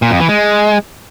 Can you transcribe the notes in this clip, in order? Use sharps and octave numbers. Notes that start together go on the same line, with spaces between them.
A#2
F2
E3
G#3